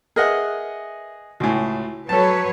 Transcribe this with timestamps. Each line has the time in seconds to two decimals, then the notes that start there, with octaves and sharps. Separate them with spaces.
0.16 G#4 A#4 B4 D#5 E5 F#5
1.40 C#2 A2 F#4 G#5
2.09 F#3 A4 B4 C#5 A5